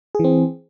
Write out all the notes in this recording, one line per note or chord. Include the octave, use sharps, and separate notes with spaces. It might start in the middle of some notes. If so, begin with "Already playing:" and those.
E3 C4 G#4